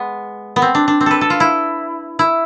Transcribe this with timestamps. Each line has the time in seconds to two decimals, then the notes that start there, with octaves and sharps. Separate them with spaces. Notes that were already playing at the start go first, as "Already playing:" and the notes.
Already playing: G#3 B3
0.56 B3
0.62 C4
0.75 D4
0.88 D4
1.01 C4
1.06 A4 B4
1.21 A4
1.30 F4
1.40 E4
2.19 E4